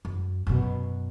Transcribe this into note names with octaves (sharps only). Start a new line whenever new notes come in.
F#2
F#2 B2